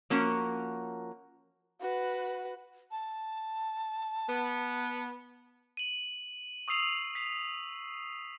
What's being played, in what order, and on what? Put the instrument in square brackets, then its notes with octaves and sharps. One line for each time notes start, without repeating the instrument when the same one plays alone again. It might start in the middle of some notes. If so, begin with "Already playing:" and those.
[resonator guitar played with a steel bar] F3 A#3 C#4 F#4
[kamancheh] F#4 B4
[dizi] A5
[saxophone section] B3
[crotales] D#7 F#7
C#6 D#6 E6 C7 F7 F#7
B6 C7